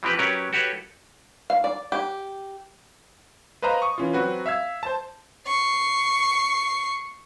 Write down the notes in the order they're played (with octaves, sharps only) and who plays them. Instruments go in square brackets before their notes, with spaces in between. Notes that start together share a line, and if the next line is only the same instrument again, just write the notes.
[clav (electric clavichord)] E3 F3 C4 G4 B4
F#3 C#4 G4 A#4 B4
F#4 G4 A4 B4 C#5
[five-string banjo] F5
D5
G4
[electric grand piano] B4 C5 D#5 F5 A#5
C#6 D#6
E3 C#4 F4
F#3 C4 F#4 B4
E5 F5 E6 G#6
C5 A5
[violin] C#6 C7